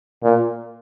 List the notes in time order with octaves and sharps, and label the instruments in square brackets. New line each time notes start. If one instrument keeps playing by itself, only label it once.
[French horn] A#2